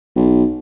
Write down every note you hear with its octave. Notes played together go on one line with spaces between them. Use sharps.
B1